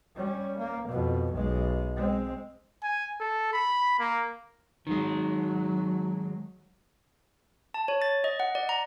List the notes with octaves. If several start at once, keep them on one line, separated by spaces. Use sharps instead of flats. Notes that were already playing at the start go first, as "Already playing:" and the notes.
G3 C#4
A#3
F2 B2
B1 G#3
G#3 C4
G#5
A4
B5
A#3
D#3 F#3 G#3
A5
C#5
A6
D#5
F#5
D5
A#5